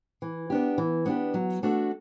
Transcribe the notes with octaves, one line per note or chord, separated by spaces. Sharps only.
E3
B3 D4 G4
E3
B3 D4 G4
F#3
A3 D4 F#4 A4